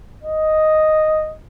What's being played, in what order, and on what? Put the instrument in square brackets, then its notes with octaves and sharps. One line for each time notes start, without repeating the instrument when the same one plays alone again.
[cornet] D#5